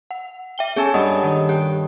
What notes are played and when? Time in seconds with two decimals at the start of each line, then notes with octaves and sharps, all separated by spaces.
0.11 F#5
0.58 E5 G5 G7
0.76 C#4 G#4 A4 G#5
0.94 G2 D#5 F#5 D#6
1.23 D#3
1.49 G4 G5